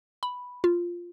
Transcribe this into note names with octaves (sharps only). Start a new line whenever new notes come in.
B5
F4